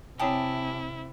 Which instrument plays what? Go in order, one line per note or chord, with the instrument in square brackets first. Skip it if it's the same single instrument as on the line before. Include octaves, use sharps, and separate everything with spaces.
[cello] C3 [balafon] C4 C#5 G#5 [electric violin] E4 [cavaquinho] G4 A5 D#6